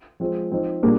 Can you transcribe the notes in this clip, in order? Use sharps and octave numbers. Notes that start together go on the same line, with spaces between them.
F3 G#3 C4 F4
F3 C4 D#4
A#2 G3 A#3 D4 G#4